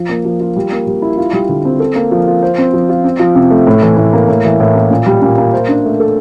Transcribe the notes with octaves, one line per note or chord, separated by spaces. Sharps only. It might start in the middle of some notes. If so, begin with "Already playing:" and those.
Already playing: F3
A#3
F3
F4
G3
A#3
G3
E4
F4
G3
D3
C4
A4
A#3
F3
F4
C5
C4
F3
F4
C4
F3
C3
A3
A2
E3
A2
A#3
A2
E3
A2
A#3
A#2
G3
A#2
A#3
C5
D4
A3
A4